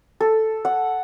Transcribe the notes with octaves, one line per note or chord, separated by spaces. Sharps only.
A4
F#5